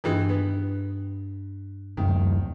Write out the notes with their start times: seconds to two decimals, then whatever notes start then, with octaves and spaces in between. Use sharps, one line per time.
0.04 G2 D#3 E3 G#3 D4
0.29 B3
1.97 D1 F#2 D#3